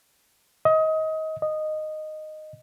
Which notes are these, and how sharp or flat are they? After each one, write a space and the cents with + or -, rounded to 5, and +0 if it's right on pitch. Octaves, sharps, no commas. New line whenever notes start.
D#5 +25
D#5 -10